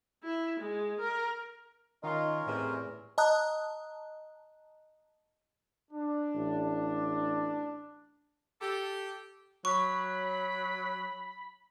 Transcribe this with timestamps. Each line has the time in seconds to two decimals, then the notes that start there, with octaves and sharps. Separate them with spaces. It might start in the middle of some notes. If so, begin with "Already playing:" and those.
0.23 E4
0.60 G#3
0.99 A#4
2.03 D#3 C#4 D#4 F4 A#4
2.46 E2 A2 C3
3.18 D#5 A5 A#5 D#6 F#6
5.91 D4
6.35 A1
8.61 G4 A4
9.65 F#3 B5 C#6